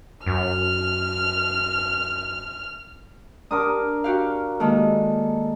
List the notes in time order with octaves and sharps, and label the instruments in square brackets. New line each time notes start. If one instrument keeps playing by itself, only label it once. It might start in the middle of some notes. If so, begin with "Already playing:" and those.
[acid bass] F#2 [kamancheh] F6
[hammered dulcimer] D4 A#4 D6 [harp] D#6
[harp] F#4 G4 F5
[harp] D#3 G#3 A#3 [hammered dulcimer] A4